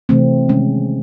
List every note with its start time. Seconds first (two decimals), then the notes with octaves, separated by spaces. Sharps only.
0.09 C3 E3 A3 C4
0.49 C3 D#3 G#3 C#4